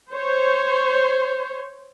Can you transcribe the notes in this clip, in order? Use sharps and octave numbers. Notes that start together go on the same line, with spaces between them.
C5 C#5